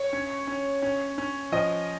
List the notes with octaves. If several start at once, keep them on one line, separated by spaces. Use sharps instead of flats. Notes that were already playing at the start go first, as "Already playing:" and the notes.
Already playing: C#5
C#4
C#4
C#4
C#4
F3 D#5